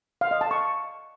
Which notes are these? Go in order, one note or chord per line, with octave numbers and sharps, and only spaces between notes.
F5
D#5
A5
C#6